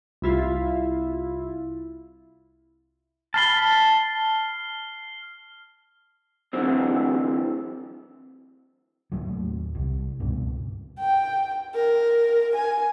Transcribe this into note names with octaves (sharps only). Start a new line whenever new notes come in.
C2 E4 F4
A5 B5 F6 C7 G7
F#2 D3 E3 C4
D#2 A2 F#3
C2
C#2 G2 B2
G5
A#4
G#5